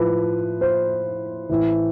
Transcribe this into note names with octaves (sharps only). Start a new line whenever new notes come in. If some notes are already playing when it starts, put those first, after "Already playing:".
Already playing: A2 F3 B4
C5
A2 E3